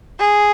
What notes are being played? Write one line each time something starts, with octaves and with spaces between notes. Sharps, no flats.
G#4